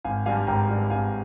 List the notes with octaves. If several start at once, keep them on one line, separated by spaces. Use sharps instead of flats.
G#1 F5 G#5
G2 G3 F5 G#5
G#1 G5 A#5
G2 G3
G#1 F5 G#5